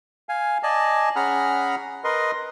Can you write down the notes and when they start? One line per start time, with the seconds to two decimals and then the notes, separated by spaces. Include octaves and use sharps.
0.29 F5 G#5
0.63 D5 D#5 G#5 A5
1.16 C#4 G#4 F#5 A#5 B5 F6
2.04 A#4 B4 D#5 C6